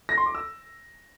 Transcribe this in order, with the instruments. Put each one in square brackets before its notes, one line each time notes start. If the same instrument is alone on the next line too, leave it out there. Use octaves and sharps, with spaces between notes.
[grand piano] A#6
C6
D6
E6